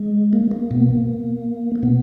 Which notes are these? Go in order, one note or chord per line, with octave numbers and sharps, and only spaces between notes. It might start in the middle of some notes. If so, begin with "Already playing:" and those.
Already playing: G#3
A#3
A#3
B2 B3
A#3
A#3
B2 B3